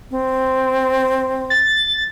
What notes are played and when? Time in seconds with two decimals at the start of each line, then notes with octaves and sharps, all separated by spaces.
0.11 C4
1.50 A6